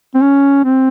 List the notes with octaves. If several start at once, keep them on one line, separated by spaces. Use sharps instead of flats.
C4
C#4
C4